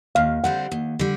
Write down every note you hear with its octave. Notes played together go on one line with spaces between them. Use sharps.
D#2 F5
D3 G3 C4 F#5
D#2
D3 G3